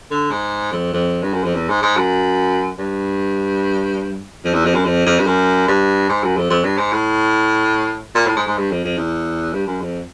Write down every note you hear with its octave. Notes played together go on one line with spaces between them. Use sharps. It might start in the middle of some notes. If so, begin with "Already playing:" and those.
D3
G#2
F2
F2
G2
F#2
F2
E2
G#2
G#2
F#2
G2
F2
E2
F2
F#2
F2
F2
G2
F#2
G2
G#2
F#2
F2
F2
G2
G#2
A2
A#2
A2
G#2
G#2
G2
F2
F2
E2
G2
F#2
F2